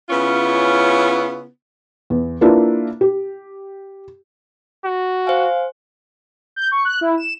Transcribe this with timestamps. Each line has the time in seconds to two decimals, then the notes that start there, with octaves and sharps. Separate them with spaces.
0.10 C#3 B3 C#4 E4 F4
2.10 E2
2.41 A#3 D4 E4 F4 B4
3.01 G4
4.84 F#4
5.27 C5 F5 G#5
6.56 G6
6.71 C#6
6.85 F#6
7.01 E4
7.18 E7